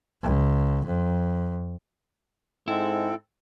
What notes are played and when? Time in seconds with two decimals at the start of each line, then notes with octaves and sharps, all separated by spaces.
0.22 C#2
0.85 F2
2.68 G#2 G#3 C4 E4 A4